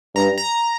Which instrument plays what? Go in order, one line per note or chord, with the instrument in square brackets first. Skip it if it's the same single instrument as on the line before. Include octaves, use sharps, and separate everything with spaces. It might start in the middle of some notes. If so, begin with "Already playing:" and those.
[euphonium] G2 [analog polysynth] A#5
[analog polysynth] A#5